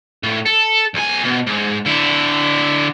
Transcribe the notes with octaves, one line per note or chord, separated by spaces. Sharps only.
A2
A4
B1 G#5
B2
G#2
D3 E4